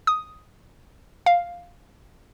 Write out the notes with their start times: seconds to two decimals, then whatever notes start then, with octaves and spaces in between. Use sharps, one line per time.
0.07 D#6
1.26 F5